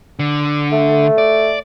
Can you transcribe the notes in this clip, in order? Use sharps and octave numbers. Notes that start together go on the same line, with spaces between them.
D3
A3
D5